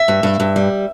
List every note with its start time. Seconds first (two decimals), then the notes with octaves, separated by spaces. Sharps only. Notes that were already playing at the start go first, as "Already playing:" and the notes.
Already playing: E5
0.08 G2
0.23 G2
0.40 G2
0.56 G3